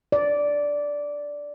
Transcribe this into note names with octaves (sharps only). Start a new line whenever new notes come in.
D5